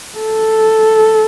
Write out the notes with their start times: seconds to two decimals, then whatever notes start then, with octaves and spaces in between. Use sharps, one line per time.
0.18 A4